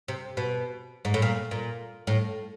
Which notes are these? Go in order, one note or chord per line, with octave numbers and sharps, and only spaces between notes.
C3
B2
G#2
A2
A#2
A#2
A2